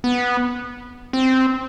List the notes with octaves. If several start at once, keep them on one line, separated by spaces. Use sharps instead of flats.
B3
C4